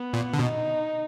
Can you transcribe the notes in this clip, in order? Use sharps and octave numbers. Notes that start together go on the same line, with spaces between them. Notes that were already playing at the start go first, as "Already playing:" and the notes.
Already playing: B3
A#2
D3
B2 D#4